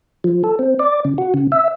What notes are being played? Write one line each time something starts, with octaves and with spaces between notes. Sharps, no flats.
F3
A4
C4
D5
C#3
F#4
C#3
E5